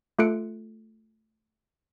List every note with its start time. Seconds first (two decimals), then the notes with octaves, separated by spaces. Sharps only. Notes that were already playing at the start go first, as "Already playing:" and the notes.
0.19 A3 F4 A4 F#6 C#7 D7